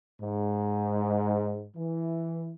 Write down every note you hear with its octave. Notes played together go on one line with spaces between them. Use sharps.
G#2
E3